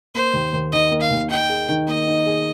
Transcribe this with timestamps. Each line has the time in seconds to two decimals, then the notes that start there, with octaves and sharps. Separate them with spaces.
0.15 A#3 C5
0.34 D#2
0.53 D#2
0.72 D#3 D#5
0.91 A#3
1.01 F5
1.11 D#2
1.30 D#4 G5
1.50 G#4
1.69 D#3
1.88 A#3 D#5
2.07 D#4
2.27 G#4